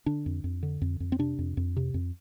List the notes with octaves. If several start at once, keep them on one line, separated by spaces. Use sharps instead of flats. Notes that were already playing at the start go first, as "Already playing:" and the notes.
D3 D4
F2
F2
D3
F2
F2
C4
C3 D4
F2
F2
C3
F2